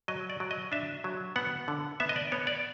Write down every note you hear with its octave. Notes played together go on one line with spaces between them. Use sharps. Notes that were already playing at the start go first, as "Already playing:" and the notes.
F#3 D#5
D5
F#3
D#5
D4 E5
F#3
B3 F#5
D3
B3 E5
D#5
D5
B3 C#5
D5